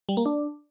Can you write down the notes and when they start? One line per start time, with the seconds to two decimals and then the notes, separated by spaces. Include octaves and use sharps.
0.09 G3
0.17 A#3
0.26 D4